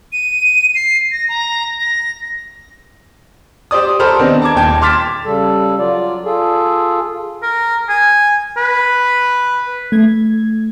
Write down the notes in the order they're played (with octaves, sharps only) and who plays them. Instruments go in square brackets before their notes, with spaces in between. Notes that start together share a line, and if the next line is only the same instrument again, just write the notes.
[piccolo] D#7
C7
A#6
A#5
A#6
[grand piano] G4 C5 D5 D#6
G4 A4 A#4 C5 B5 F6
D#3 B3 C4 D4 D#4
A5 A#5 D6 G#6
D#1 D#2 G5 A5 G#6
C6 D6 F6 A6 B6 E7
[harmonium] C#3 G3 A4
F#3 F4 D5
F4 G#4 A4
[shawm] A#4
G#5
B4
[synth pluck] A3 G#6